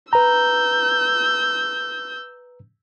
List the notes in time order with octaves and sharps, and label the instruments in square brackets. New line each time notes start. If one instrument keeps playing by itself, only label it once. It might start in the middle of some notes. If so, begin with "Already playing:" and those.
[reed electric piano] B4 A#5 [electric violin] E6 G6